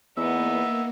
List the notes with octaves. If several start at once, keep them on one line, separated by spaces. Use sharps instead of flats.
E2 A#3 B3 D#4 E5